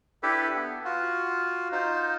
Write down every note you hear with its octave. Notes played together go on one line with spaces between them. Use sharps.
D4 E4 G4 A4 B4
B3
F4 F#4
D#4 F4 C5